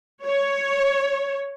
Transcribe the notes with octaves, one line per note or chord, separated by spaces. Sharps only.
C#5